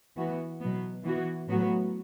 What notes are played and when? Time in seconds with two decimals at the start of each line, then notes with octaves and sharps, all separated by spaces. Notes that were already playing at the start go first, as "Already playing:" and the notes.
0.16 E3 B3 F#4
0.61 B2 F#3 B3
1.04 E3 B3 F#4
1.48 A2 F#3 B3 F#4